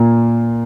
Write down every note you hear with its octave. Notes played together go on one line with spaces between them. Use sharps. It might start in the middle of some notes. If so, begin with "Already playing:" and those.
Already playing: A#2 A#3 F4